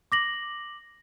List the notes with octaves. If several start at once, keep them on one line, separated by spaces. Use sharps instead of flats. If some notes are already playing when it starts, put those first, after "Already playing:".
D6 A#6 F#7